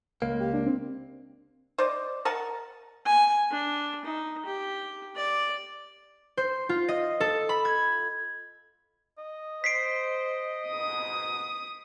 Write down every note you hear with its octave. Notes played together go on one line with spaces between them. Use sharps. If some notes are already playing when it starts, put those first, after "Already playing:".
C#2 A#3
G4
D4
C4
C5 D5 D#5
A#4 D#5 F#5 A5
G#5
D4
D#4
G4
D5
C5
F4
D#5
A4
B5
G#6
D#5
C5 B6 C7 D7
F2 G#2 B2 D#6